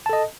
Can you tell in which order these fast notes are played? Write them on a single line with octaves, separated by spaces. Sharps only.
A5 A4 D#5